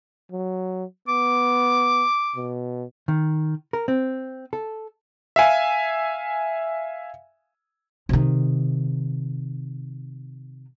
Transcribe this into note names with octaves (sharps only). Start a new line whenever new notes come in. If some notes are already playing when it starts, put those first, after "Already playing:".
F#3
B3 D6
B2
D#3
A#4
C4
A4
E5 F5 G#5
C3 D#3